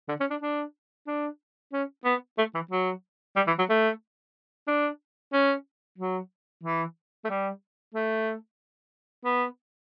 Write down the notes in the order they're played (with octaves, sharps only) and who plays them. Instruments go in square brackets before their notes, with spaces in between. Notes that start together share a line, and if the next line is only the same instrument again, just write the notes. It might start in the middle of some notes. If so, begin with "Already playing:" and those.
[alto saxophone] D3
C#4
D4
D4
D4
C#4
B3
A3
E3
F#3
G3
E3
F#3
A3
D4
C#4
F#3
E3
A3
G3
A3
B3